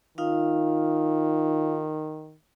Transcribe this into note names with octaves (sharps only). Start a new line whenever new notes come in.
D#3 D#4 F4 F5